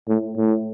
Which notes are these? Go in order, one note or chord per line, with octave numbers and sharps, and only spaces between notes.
A2
A2